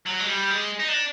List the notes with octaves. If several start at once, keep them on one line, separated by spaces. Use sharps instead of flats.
F#3
G#3
G3
G#3
D#4
D4